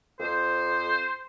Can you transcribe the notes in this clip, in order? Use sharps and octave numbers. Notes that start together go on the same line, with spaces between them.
F2 C5